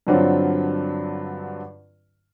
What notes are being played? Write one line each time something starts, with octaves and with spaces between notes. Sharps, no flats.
G2 D3 F#3 C4 D4 F4